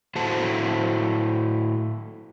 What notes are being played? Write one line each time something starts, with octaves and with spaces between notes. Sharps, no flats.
A2 A3 F#4 C5 A5